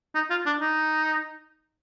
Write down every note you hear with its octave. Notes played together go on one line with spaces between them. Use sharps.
D#4
F4
D4
D#4